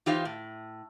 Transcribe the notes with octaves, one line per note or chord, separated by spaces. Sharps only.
E3 D#4 F4 G4 C5 F5
A2